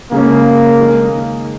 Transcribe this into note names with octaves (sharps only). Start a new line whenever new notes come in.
C#3 G#3 A#3 C#4
D#3 G#3 D#4